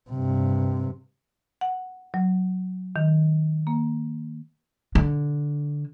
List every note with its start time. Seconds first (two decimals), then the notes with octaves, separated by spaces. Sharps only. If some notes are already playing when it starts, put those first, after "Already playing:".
0.10 G2 C3
1.61 F#5
2.14 F#3
2.96 D#3
3.67 A#3
4.95 D3